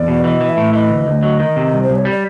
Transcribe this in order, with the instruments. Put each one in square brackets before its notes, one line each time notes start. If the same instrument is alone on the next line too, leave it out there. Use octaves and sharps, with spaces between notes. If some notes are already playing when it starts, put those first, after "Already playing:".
Already playing: [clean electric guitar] E2 [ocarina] D5
[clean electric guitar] B2
[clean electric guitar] E3 [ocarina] D#5
[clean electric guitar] E3
[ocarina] E5
[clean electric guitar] A2
[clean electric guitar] E3 [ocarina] D#5
[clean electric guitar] D2
D2
F#3
D#3
C3
C2
[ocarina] C5
[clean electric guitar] C2
[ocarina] C#5
[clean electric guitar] G3 [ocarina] D5